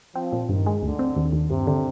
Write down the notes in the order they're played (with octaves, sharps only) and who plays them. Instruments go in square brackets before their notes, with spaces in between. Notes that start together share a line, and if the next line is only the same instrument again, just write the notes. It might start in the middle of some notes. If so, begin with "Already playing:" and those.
[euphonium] F3 [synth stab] C4
[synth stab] A#2
[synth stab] G2 [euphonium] D#3
[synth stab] G#3
[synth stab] D2 [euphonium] D3
[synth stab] C4
D#2
D#2
[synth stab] G2 [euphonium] C3
[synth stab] D3